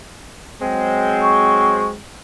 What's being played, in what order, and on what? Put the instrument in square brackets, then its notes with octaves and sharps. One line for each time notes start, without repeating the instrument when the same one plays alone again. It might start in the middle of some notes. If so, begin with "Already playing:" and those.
[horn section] F#3 G#3 C4
[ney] C#6